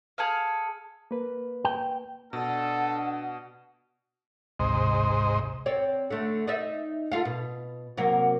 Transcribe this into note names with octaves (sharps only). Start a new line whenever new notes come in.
G#4 A4 F5
A#3 B4
G5
B2 D4 A4 F#5
A1 D2 G#2 C3 C5 D#5
C4 C#5 D5
D3 A3
D#4 D5 E5
A3 F4 F5
B2
C3 F#3 A#3